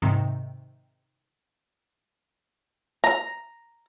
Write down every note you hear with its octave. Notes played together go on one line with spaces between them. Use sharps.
G#2 C3 D#3
A#5